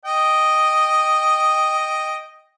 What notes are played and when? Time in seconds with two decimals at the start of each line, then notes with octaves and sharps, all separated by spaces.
0.05 D#5 G5